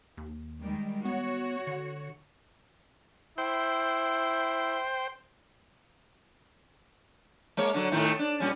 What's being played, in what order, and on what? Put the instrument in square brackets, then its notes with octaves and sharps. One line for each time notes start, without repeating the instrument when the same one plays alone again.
[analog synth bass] D#2
[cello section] D#3 G3 G#3
[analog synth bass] B3 [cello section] F#4 C#5
[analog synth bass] D3
[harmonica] E4 [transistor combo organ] C5 G5
[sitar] G#3 A#3 C#5
D3 F#3
A2 D#3 A3
D4
A#2 G3 C#4